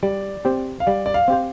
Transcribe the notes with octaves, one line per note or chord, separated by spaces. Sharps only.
G3 D5
C4 G4 C5
F5
G3 D5
D5
F5
C4 G4 C5